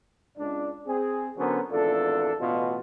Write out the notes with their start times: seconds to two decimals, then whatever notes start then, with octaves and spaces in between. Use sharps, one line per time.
0.38 C#2 D4
0.86 C4 G#4
1.36 D3 F#3 B3 C#4 A#4 C5
1.71 G#1 E2 D4 F4 A4
2.40 A1 B2 F4